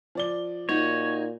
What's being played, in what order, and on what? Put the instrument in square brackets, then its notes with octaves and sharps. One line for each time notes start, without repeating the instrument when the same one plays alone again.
[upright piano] F3 D5 G7
[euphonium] A#2 [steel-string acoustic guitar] D#4 F#4 [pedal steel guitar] C#5